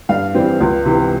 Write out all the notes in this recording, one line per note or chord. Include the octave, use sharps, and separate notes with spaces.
G2 F5
E3 G3 C4
C#2
C3 E3